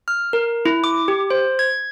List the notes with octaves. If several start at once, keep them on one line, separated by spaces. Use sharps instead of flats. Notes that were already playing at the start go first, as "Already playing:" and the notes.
F6
A#4
E4
D6
G4
C5
G#6